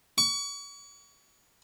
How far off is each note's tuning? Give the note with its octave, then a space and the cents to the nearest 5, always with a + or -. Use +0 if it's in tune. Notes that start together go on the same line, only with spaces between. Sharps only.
C#6 +35